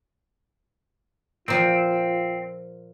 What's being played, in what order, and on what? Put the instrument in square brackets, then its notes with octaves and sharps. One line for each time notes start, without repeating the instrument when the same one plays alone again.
[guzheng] A#2 F3 [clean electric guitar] C4 [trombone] F4